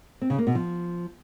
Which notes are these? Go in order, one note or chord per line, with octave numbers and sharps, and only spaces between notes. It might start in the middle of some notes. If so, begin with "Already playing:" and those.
C4
C#3
A#3
B2
F3